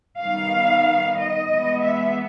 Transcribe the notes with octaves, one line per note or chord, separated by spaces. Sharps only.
D#3 G3 B3 F5
D#5
E3 G#3 B3
E5